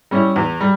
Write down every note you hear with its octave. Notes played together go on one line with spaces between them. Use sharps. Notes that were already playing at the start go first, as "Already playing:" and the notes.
G3 C#4 E4
E2
G3